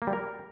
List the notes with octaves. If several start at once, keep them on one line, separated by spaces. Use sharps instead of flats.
A#3
G3
A#4